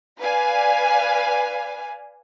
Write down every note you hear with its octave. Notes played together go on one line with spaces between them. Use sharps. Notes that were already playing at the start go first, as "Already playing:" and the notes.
B4 D5 F5 G#5